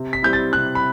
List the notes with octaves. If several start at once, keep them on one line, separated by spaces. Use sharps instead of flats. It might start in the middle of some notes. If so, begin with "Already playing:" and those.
Already playing: C3
B6
G3 C4 E4 G6
A6
C3 F#6
B5